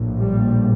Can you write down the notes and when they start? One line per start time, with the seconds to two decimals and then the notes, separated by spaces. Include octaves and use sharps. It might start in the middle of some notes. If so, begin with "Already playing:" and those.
Already playing: A#1 A2
0.20 G3